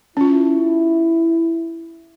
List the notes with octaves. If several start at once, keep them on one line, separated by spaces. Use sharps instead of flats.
C#4 E4 F4